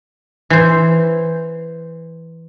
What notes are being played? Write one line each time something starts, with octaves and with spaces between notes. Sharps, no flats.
E3 C5